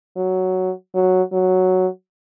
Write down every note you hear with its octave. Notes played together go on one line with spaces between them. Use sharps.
F#3
F#3
F#3